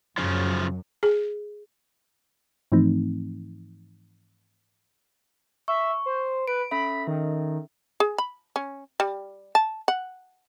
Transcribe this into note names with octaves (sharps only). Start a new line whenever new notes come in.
F#2 C#3 F3
G#4
G#2 E3 F3 A3 C4 D#4
E5 C#6
C5
B4 D7
C#4 A4 E5 B5
D#3
G#4
B5
C#4
G3
A5
F#5